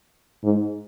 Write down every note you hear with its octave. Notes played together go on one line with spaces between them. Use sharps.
G#2